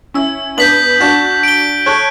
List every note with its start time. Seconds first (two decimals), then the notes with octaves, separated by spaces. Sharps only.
0.14 C#4 E4 E6
0.57 B3 D4 G6 B6 F#7
1.00 D4 F#4 G6
1.43 D7 G7
1.86 A4 C#5 F#6